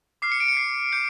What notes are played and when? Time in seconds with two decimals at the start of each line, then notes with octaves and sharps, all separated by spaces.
0.22 D6 F6 C7
0.32 C#7
0.40 D7
0.48 C#7
0.57 C7
0.92 D6 G6 C#7